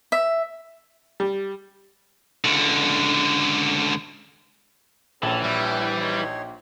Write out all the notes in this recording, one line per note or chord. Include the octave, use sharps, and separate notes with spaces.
E5
G3
C#2 D3
A#1 E3 C#4 A4 A5
G3 E4 C#5 B5
D#4 C#5 C6